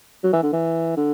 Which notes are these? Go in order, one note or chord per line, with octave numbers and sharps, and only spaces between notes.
F#3
E3
D3
E3
D3